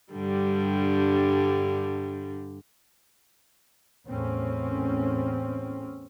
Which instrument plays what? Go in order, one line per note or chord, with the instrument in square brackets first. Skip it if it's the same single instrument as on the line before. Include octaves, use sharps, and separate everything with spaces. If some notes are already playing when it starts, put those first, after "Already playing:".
[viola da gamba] G2 D3 G3
[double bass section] E2 A2 C4 C#4